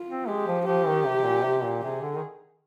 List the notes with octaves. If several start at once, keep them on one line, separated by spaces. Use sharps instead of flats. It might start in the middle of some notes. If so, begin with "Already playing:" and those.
Already playing: F4
C4
G#3 G4
F3
F3 G4
D#3
C3
A#2
C3
A#2
C3 G#4
D3
D#3